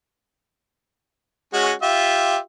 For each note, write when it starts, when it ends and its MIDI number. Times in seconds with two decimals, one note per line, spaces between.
1.54 1.72 56
1.54 1.72 61
1.54 1.72 66
1.82 2.37 65
1.82 2.37 67
1.82 2.37 76